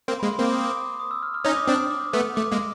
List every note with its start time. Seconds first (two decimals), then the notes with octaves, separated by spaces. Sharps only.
0.08 A#3 C4 C6
0.20 G#3 A#3 B5
0.30 C6
0.38 A#3 C4 D6
0.53 D#6
0.64 D6
1.00 D#6
1.11 E6
1.23 F6
1.34 F6
1.45 C#4 D#4 D#6
1.57 D6
1.67 C4 D4 D#6
1.90 D6
2.13 A3 B3
2.36 A3 D6
2.52 G#3 A#3